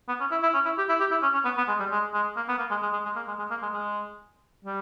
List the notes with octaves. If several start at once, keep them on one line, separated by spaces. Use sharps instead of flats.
B3
C#4
E4
E4
C#4
E4
G4
E4
G4
E4
C#4
C#4
B3
B3
G#3
G3
G#3
G#3
A#3
B3
A#3
G#3
G#3
G#3
G#3
A#3
G#3
G#3
A#3
G#3
G#3
G3